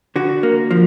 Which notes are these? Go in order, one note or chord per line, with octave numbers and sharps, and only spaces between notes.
D3 F#4
A#3
F3